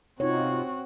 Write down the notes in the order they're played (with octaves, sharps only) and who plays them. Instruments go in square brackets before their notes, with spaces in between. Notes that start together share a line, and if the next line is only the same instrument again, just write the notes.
[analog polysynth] C3 D#4 F4 [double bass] C4 [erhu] F#4 [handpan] C#5